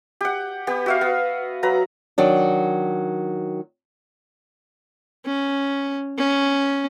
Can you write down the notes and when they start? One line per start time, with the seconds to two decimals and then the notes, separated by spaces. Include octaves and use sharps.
0.21 G4 F#5
0.67 B3 G4
0.86 F#4 E5 F5
1.01 B3
1.63 F#3 B4 A#5
2.18 D#3 F#3 D4
5.25 C#4
6.18 C#4